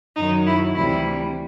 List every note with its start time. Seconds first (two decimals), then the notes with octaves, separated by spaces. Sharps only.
0.16 F#2 D#3 F#3 D#4
0.46 E4
0.75 D2 C3 E3 G3 E4